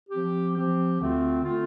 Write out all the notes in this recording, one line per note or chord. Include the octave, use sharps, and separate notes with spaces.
F3 C4 G4
F3 C4 G4
D2 D3 A3 C4 F4
D3 A3 C4 F4